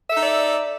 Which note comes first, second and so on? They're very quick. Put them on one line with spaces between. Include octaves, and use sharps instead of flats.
E5 A4 D#4 D5